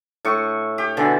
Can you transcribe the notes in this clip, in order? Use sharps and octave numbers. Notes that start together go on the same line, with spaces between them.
A2 C#6
G4
B2 D3 E3